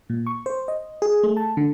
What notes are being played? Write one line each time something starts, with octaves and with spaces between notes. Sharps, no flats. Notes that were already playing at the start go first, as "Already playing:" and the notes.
A#2
C#6
C5
D#5
G#4
A3
A5
D3